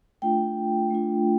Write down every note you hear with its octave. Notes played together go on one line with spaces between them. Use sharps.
A3 D4 F4 G5
A3 D4 F4